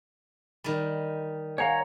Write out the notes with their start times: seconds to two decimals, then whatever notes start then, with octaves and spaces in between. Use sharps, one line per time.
0.64 D#3 G3
1.58 C#5 F5 F#5 G#5 A#5